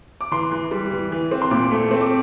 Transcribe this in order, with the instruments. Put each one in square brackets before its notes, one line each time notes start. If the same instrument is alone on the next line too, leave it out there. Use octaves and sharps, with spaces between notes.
[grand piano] D6
E3 C6
E3
G3
E3
E3
C4
C6
A#2 D6
A3
C4
D6